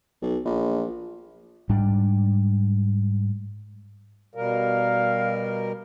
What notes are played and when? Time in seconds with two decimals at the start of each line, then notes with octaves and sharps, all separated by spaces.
0.22 B1
0.45 A#1
1.69 G#2 G3 D4
4.35 B2 G3 A#4 F5